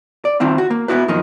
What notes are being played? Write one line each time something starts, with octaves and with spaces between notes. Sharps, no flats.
D5
D#3 C4 E4 F4
F#4
A#3
B3 D4 E4 F#4 B4
F#2 D#3 F3 A#3 D#4